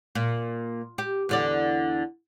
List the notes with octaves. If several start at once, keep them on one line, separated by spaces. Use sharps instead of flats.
A#2
G4
E2 D3 D5